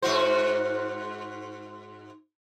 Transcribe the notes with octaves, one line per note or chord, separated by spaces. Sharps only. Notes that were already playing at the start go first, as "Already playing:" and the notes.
G#2 F#4 C5